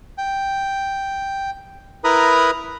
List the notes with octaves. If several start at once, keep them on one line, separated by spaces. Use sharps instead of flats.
G5
E4 A#4 B4 A#5 B5 D#6